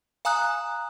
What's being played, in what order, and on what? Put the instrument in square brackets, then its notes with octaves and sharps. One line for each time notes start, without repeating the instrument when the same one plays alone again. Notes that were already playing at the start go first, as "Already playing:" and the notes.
[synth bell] F5 G#5 A#5 D#6 F#6